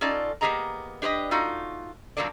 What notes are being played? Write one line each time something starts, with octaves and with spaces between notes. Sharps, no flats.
C#4 D#4 F4 A4 D5 A5
A#3 B3 G4 G#4 D#5 A#5
D4 G4 B4 C5 D#5
A3 D#4 F4 F#4
C3 F3 F#3 A#3 D4 D5